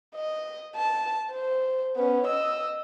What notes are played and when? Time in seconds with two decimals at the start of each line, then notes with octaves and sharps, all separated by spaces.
0.15 D#5
0.76 A5
1.31 C5
1.96 B3 C#4
2.27 D#5 E6